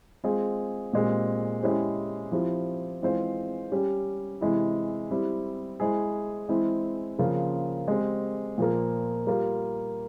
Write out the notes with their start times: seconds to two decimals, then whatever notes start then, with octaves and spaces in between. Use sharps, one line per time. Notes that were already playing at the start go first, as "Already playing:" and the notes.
0.24 G#3 C4 F4 G#4
0.93 A#2 G#3 C4 G4
1.63 G#3 C#4 E4 G4 C5
2.32 F3 C4 E4 G4
3.02 E3 G#3 C4 F4 C5
3.72 G3 C#4 G4
4.41 C3 E3 G#3 E4
5.11 G3 C4 E4
5.80 G#3 E4 G#4 C5
6.49 E3 G#3 C4 E4
7.19 C#3 F3 A#3 F4
7.88 G#3 C4 G4
8.58 A#2 F3 A#3
9.27 G3 A#3 F4